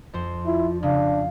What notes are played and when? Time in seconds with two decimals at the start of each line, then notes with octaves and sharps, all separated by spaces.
0.13 F2 C5
0.46 E4 F4
0.83 C#3 D4 F5